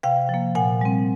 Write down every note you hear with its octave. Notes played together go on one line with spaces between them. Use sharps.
C3 F5 G5
F3 A#3
A#2 F#5 G#5
G3 C4